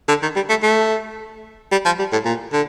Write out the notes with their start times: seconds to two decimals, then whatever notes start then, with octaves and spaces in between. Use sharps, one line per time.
0.08 D3
0.22 D#3
0.36 G3
0.49 A3
0.63 A3
1.72 G3
1.85 F3
1.99 G3
2.12 A2
2.25 A#2
2.53 D3